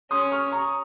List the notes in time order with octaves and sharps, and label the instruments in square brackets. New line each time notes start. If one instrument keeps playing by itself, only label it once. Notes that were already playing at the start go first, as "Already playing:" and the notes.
[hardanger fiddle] C#4 [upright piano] C6 D#6
[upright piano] C#6 F6
A#5 C#6